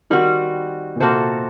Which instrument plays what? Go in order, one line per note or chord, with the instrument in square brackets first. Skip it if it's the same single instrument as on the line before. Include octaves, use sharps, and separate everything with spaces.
[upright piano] D#3 [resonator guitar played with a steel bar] G3 C4 F#4
[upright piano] A#2
[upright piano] C3 [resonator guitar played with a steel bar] A#3 F#4 A4 C5